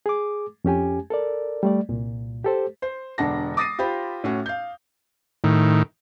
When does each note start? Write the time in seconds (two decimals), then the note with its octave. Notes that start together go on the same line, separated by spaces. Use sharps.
0.06 G#4 D6
0.65 F2 C#4 G4 G#5
1.10 A4 A#4 D5
1.63 G3 A3 D5
1.89 C2 A#2
2.44 G4 A4 C5
2.82 C5
3.18 E1 D3 D4 F#5 A5 A#6
3.57 D6 D#6 A6 A#6 C7 D#7
3.79 F4 G4 C5 B5
4.24 A2 C#4 F#4
4.46 F5 G6
5.44 A2 D#3